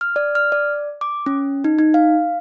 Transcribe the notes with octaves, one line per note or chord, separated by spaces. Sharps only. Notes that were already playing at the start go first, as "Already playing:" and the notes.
F6
D5
F6
D5
D6
C#4
D#4
D#4
F5